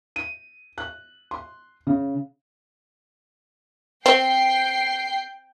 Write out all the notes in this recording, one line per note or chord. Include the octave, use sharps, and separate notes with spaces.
D#7
F#6
C6
C#3
C4 G5 C7